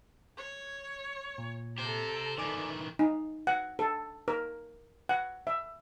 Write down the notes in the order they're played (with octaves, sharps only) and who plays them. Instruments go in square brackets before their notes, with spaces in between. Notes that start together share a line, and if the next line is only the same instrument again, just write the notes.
[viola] C#5
[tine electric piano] A#2
[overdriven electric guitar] G4 C5 [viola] A4 A#5
[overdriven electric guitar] D#3 E3 [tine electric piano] D5 G#5 D6
[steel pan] D#4
F#5
A4
A#4
F#5
E5